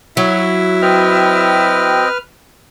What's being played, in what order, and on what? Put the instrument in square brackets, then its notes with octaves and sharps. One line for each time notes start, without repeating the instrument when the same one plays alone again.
[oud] F#3 [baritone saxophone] E4
[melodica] C4 D#5 G5 [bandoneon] B4 F6